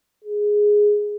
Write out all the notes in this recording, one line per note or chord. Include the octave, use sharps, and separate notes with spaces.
G#4